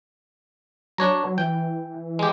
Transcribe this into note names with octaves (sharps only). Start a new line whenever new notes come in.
F#3 D4 C#5 A#5
E3 G5
G#3 G4